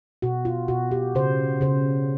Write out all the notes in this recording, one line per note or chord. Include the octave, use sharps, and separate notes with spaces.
B2 F#4
F4
B2 F#4
G4
C#3 C5
C#3 C5